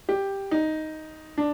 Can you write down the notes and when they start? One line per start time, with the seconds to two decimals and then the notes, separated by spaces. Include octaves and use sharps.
0.09 G4
0.51 D#4
1.38 D4